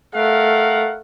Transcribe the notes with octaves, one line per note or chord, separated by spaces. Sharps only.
A3 A#4 F5 F#5